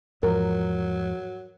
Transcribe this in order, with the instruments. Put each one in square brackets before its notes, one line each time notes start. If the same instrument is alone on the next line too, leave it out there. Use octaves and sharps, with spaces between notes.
[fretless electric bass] E2 G#2 F3 [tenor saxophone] F#3 [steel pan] A#4